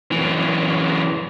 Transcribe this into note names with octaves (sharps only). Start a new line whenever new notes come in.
F#2 E3